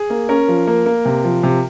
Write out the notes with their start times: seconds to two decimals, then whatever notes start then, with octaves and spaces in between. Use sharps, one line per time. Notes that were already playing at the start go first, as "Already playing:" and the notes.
Already playing: G#4
0.10 A#3
0.29 C#4 A#4
0.48 F3
0.67 A#3
0.86 A#3
1.05 C3
1.24 F3
1.43 C3